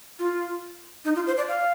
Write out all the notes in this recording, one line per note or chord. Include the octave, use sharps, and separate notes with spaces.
F4
D#4
F4
C5
D5
F5